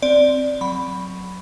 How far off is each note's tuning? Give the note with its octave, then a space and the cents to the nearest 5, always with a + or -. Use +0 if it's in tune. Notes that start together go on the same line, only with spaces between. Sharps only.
C4 +0 D5 +0
F#3 +0 B5 +0